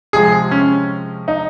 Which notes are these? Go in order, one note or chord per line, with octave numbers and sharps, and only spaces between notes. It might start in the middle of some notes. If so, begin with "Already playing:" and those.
C3 F3 G#3 G#4
C#4
D#4